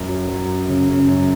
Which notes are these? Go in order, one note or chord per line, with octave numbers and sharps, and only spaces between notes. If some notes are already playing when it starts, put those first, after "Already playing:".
Already playing: F#2
F#3
F#3
F#2
C#3
C#3
F#2